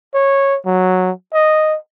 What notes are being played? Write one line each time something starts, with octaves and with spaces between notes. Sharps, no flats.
C#5
F#3
D#5